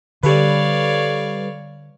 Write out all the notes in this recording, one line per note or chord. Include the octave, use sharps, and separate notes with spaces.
D3 G3 A4 B4 C#5 D5 F5